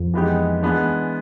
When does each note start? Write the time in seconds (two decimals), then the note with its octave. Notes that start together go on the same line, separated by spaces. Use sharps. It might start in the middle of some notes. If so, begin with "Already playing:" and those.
Already playing: F2
0.14 E3 G#3 B3 D#4 G4
0.63 E3 G#3 B3 D4